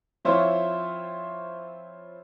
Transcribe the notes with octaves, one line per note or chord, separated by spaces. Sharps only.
F3 C4 E4 F4 C5 C#5